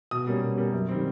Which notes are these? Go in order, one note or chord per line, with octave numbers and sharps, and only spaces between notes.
B2 D#6
G3 A#3 C#4
B2
G3 A#3 C#4
F#2
D#3 G3 C4